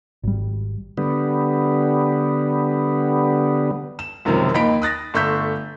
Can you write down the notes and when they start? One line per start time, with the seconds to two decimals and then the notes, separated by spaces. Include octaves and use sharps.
0.23 G#1 G3
0.98 D3 G3 B3
3.99 E7
4.25 C#2 F#2 C3 D#3 F3
4.54 D#2 D#4 B5 B6 D7
4.82 D#6 F#6 A6 A#6
5.14 G1 A3 C#6 E6 G6 B6